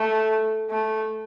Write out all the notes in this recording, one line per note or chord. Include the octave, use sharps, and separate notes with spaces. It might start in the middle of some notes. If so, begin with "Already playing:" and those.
Already playing: A3
A3